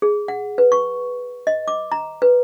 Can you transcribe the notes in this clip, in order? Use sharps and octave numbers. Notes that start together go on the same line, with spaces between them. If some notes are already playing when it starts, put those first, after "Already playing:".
G#4
F#5
B4
C#6
D#5
D6
A#5
B4